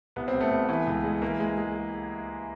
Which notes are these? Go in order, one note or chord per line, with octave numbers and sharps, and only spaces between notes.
C2 B3
C4
C2
A3 B3
C2
E3
C#2
G#3
E3 A#3
G#3
G#3